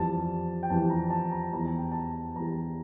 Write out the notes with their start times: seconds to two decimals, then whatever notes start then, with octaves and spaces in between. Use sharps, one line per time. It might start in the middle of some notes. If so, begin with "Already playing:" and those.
Already playing: F2 E3 G3 A5
0.63 G5
0.70 F2 E3 G3 A5
0.90 A#5
1.10 A5
1.31 A#5
1.52 E2 E3 G3 A#5
1.65 A5
1.78 G5
1.92 A5
2.36 E2 E3 G3 A#5